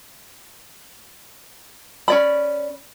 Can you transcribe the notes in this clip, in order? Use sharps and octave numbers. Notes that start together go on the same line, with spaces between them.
C#4 D5 B5